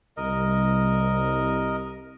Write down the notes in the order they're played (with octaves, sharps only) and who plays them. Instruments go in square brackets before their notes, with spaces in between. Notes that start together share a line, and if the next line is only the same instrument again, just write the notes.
[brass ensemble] C2 [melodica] A#4 D#5